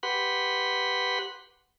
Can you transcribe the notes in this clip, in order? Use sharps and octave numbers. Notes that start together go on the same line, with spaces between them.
G4 B4 F#5 B5 C6